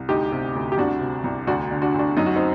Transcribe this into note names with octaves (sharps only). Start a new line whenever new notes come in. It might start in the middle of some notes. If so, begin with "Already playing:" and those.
Already playing: C2
D2 D#4 G4
C3
D2
G4
C2 D4 F#4
C3
C2
D2 D4 F#4
D3
D4 F#4
D2
D4 F#4
F#2 D#4
F#4
C4 D#4